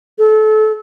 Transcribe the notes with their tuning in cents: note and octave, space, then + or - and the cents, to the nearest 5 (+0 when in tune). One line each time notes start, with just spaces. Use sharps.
A4 -25